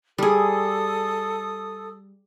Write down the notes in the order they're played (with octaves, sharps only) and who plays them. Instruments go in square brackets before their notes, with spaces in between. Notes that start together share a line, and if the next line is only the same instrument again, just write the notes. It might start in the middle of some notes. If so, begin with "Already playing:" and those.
[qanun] G3 G#4 [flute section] A4 D#6